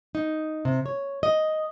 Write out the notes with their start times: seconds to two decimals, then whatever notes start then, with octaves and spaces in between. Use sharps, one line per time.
0.15 D#4
0.65 C3
0.86 C#5
1.23 D#5